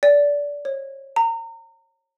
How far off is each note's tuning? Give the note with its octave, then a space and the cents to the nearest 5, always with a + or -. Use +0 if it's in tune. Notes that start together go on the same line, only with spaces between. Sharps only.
D5 -20
C#5 -35
A#5 -30